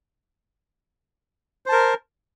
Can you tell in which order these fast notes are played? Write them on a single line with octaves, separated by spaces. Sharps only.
C5 A5 A#4